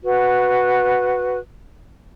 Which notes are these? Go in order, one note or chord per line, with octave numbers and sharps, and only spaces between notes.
F#4 B4